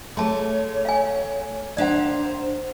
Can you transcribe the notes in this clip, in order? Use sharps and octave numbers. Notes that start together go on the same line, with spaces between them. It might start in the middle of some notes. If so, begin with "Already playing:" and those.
A3 G#4 C#5 A5 C6
F5 G#5
D#2 D4 C5 D5 F5 F#5 A#5